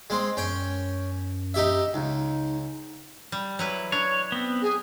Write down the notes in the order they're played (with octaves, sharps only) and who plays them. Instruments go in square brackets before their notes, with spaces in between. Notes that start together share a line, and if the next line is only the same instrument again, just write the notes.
[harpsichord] G#3 C4 [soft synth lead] C6
[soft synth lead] F#2 [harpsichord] C#4 G5
[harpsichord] D#4 G4 E5
[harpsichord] C#2 [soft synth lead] D#4
[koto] G3
F#3 E4 B4
[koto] D4 [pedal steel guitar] C#5
[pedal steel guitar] B3 C4
[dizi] G#4